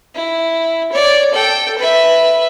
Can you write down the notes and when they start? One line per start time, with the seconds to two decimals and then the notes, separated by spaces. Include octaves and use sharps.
0.15 E4
0.92 C#5 D5
1.33 A4 G5
1.78 B4 E5